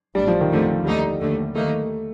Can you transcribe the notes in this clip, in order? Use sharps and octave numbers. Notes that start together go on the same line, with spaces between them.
A1 A2 G3 A3 D4
F3
D#3
F2 D3 F3 A3
D#2 D3 G3 A3 D#4
D#2 D3 A3
D#2 D#3 A3 A#3 D#4